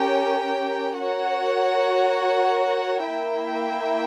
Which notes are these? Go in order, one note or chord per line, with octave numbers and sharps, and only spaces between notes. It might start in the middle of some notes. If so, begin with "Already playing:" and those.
Already playing: C#4 G4 A#4 C#5 G5
F#4 A#4 C#5 F#5
A#3 E4 A#4 E5 G5